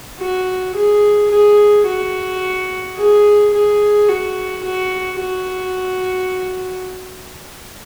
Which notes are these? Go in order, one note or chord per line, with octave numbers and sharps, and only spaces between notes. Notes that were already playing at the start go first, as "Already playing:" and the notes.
F#4
G#4
G#4
F#4
G#4
G#4
F#4
F#4
F#4